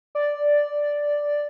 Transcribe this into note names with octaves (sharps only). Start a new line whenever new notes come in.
D5